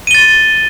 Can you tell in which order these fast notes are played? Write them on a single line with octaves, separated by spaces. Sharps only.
D#7 G7 A6